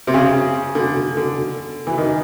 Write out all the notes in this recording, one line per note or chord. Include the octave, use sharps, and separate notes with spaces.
C3
C#3
D3
D3
E3
D#3